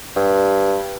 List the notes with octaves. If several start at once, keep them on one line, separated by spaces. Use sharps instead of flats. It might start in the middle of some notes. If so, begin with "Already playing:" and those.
G2